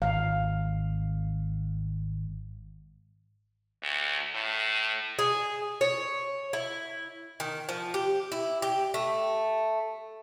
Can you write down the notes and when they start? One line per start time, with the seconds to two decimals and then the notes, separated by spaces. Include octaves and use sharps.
0.02 G#1 F5
3.82 D2
4.34 A2
5.19 G#4
5.81 C#5
6.53 E4
7.40 D#3
7.69 F3
7.94 G4
8.32 E4
8.62 G4
8.94 A3